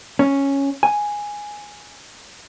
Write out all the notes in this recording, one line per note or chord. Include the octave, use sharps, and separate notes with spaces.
C#4
G#5